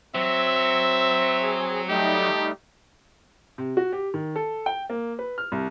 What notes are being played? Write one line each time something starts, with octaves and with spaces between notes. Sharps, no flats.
F#3 C4 E5
G#4
G3 A3 D#4 G4
C3
F#4
G4
D#3
A4
G5
A#3
B4
F6
C2